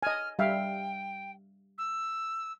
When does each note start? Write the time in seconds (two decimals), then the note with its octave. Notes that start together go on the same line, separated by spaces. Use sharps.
0.03 D#5 G#5 F6
0.39 G3 E5 F5 G5
1.78 E6